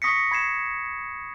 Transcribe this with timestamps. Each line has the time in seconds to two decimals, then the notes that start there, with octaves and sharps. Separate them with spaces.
0.02 C#6 D#6 A#6 B6 C#7
0.31 B5 G#6 C7 E7